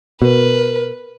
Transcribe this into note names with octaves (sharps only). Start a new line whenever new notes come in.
B2 A#4 B4